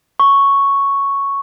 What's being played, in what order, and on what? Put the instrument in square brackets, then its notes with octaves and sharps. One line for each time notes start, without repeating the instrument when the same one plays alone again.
[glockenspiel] C#6